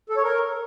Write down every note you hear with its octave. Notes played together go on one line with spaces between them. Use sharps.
A4
C#5
A#4